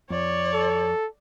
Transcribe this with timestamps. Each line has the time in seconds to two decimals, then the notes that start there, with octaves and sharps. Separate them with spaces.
0.10 F2 C#5 D5
0.54 A4